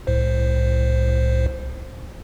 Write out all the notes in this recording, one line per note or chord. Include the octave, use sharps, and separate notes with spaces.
C2 A2 C5